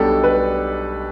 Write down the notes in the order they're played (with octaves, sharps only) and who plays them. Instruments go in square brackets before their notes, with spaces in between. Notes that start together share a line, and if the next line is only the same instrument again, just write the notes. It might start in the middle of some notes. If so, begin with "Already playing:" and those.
Already playing: [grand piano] B1 B2 G3 D4 G4 [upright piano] A4
[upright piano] B4